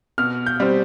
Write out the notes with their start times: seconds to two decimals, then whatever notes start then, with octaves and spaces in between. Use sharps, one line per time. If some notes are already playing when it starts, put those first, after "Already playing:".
0.18 B2 F6
0.46 G6
0.60 G3 C4